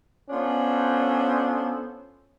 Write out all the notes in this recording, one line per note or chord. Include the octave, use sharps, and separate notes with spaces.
B3 C#4 D4 F4 A4 C5